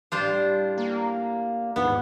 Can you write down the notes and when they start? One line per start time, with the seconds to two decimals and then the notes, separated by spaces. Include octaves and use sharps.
0.12 A2 G3 D4 F4 G4 C5
0.77 A#3
1.76 D#1 G#2 B3 F4